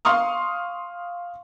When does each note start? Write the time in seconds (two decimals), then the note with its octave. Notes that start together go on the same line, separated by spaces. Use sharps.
0.05 F5 C6 C#6 D#6 F6